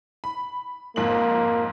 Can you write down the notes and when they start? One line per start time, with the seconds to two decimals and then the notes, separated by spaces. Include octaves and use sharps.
0.24 B5
0.96 F2 G#2 A#3 F#7